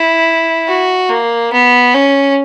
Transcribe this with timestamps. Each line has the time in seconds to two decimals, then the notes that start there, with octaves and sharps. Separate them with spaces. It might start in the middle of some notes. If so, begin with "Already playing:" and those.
Already playing: E4
0.67 F#4
1.09 A#3
1.53 B3
1.94 C#4